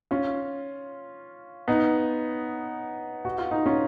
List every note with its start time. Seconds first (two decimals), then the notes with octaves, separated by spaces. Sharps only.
0.11 C#4 F4
1.68 B3 D#4
3.25 F#4
3.38 F4
3.51 D#4
3.66 C#4 F4